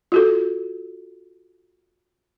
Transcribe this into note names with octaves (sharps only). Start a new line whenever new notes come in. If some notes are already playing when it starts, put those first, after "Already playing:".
F4 F#4 A4